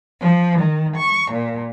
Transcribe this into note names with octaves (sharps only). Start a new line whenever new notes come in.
F3
D#3
C#6
A#2